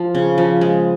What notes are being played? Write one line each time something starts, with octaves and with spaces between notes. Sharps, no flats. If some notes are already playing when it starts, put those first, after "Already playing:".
Already playing: F3
C#3
F3
G#3